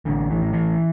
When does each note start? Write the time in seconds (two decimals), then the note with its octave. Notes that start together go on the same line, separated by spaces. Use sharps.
0.05 A1 D3
0.30 E3
0.42 A2
0.53 E3